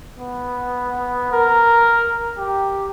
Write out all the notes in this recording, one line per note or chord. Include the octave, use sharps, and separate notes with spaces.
B3
A#4
G4